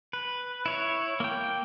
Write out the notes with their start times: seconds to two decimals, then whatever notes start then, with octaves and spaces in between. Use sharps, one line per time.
0.13 B4
0.66 E4 C#5
1.20 A#3 G5